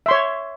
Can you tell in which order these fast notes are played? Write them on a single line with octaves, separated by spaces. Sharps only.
E5 C6 C#5